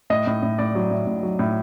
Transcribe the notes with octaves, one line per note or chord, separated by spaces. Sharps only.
A2 D#5
A2
A2
A2 D5
F#3
A2
A2
F#3
A2